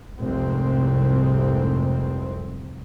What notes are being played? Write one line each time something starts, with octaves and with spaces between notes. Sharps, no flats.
F1 C2 G#2 C4